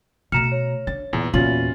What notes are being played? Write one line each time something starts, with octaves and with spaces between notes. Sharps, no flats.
B2 A3 A#5 F6 C#7 E7
C#5
D4 A6
E2 A#2
E2 A#2 C#4 F4 F#4 A6 F#7